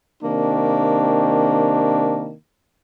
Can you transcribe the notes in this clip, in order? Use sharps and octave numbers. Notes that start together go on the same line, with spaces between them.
C3 D#3 A#3 D4